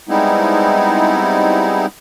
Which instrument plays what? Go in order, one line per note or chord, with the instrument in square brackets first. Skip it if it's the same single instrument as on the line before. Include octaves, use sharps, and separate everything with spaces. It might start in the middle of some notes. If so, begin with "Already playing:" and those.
[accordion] G3 G#3 B3 C4 D#4 E4